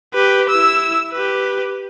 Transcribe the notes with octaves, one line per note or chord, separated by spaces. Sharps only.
G4 B4
E4 E6
G4 B4